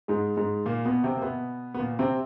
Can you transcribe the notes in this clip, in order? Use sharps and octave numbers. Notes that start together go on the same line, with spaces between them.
G#2 G#3
G#2 G#3
A#2 A#3
B2 B3
C3 C4
A#3
B2 B3
B3
A#2 A#3
C3 C4